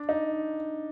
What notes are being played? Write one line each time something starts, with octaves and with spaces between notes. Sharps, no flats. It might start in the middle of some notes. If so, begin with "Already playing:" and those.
Already playing: D4
D#4